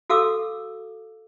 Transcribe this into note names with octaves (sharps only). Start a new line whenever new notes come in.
F#4 A4 F5 D6 E6